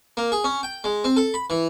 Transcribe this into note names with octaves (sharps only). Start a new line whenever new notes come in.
A#3
G#4
C#4
G5
G#3
C4
A4
B5
E3